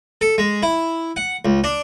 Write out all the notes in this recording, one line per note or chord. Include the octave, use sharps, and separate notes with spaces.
A4
G#3
E4
F#5
C#2
D4